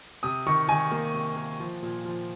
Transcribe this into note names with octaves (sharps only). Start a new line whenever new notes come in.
C3 D#6
D#3 C#6
D#3 G#5
A#3
C3
A#3
F3
A#2
F3